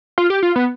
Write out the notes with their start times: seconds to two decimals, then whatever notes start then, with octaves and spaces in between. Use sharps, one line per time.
0.18 F4
0.30 G4
0.43 F4
0.56 B3